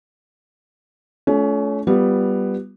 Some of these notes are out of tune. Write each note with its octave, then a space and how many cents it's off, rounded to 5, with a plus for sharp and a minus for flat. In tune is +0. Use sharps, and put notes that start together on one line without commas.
A3 -30 C#4 +25 F4 -20
G3 +0 B3 +0 F4 +0